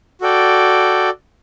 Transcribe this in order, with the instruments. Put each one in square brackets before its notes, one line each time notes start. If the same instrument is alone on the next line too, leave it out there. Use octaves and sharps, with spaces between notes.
[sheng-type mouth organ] F#4 A4 D5 G5